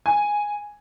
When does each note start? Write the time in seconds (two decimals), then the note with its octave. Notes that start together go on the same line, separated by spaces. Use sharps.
0.06 G#5